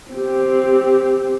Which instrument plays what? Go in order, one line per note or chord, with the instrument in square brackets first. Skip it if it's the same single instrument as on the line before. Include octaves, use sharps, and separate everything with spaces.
[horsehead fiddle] C4 G4